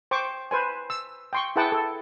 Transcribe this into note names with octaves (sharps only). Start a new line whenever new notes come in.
C5 G5 C#6 D6
B4 C5 G#5
E6
G5 C6 C#6
E4 G#4 B4 F#5 G5 A5
A4